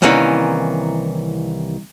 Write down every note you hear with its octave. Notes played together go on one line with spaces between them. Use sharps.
C2 D#3 E3 A#3 C#4 F#5